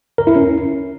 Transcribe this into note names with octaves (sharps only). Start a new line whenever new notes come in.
A#4
E4
C#4